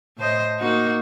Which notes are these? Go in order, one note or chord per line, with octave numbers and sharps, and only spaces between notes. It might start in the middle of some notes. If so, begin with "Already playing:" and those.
A2 C5 D#5
A#3 D#4 F#4